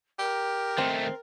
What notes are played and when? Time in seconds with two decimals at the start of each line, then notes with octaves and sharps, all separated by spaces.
0.19 G4 A#4
0.78 D#3 A3 C4